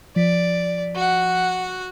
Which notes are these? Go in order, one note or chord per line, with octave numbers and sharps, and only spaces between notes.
F3 D5 B6
F#4 F#5